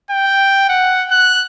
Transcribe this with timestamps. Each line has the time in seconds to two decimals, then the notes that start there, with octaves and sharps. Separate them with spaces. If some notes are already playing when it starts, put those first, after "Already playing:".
0.10 G5
0.69 F#5
1.11 F#6